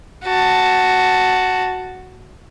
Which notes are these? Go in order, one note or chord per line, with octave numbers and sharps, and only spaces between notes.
F#4 A5